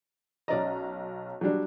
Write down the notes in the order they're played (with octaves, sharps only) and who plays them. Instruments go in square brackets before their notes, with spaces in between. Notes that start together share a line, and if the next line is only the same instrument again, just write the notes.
[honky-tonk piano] B1 C#4 A#5 [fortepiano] D5 D#5
[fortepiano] F#3 G3 D4